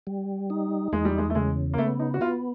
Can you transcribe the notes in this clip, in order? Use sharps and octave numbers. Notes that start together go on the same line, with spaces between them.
G3
D#4
E2 G#3
G3
G#3
A3
C#3 G#3
A#3
A3 B3
D#4
F#4
B3 F4